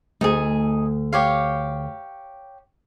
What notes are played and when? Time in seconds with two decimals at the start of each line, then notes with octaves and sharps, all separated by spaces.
0.21 D2 A3 D#4 G#4
1.12 G4 C#5 F5